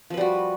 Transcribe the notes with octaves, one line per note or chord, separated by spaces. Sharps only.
F3 G3 F#4 B4